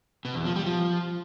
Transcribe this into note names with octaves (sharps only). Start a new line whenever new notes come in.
B2
E2
F3
G3
F3